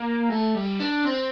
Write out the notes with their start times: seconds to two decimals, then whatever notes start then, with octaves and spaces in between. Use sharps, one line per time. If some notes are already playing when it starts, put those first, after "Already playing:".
Already playing: A#3
0.30 A3
0.55 G3
0.80 D4
1.05 C4